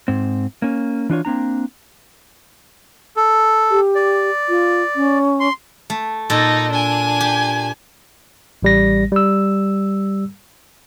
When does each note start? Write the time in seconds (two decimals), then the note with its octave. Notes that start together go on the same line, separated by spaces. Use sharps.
0.08 G#2 C4
0.62 A#3 C#4
1.09 E3 D4 F4 C#5
1.25 A#3 C4 D4 A#5
3.16 A4
3.71 G4
3.95 D5
4.49 F4
4.96 C#4
5.40 C6
5.90 A3
6.30 A#2 D#4 A4
6.71 D4 G#5
7.20 G4
8.63 A1 G3 A#6
9.12 G3 E6